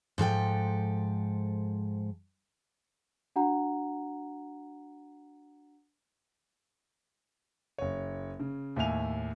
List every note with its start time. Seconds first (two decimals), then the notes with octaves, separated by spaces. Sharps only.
0.18 G#2 F3 A4 G5
3.36 D4 F#4 F#5 A#5
7.78 F#1 C#5
8.40 C#3
8.76 D#2 A2 E5 G#5 F7